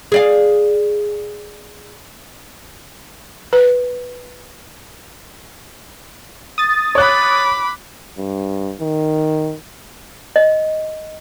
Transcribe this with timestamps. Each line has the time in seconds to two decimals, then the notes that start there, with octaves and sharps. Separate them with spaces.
0.12 G#4 D5 F5
3.53 B4
6.58 D#6 A6
6.95 C#5 B5 D6 F#6
8.18 G2
8.81 D#3
10.36 D#5